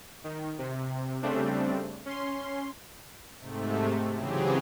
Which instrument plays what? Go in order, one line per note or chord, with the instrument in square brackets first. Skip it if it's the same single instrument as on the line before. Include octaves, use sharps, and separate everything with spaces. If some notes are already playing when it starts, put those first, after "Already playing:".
[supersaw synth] D#3
C3
C#3 G3 A3 C4 D4
C#4 C6
G#2 C3 A3
C#3 E3 F#3 C4 G4 G#4